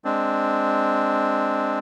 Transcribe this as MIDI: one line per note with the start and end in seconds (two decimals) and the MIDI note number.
0.05 1.79 56
0.05 1.79 60
0.05 1.79 62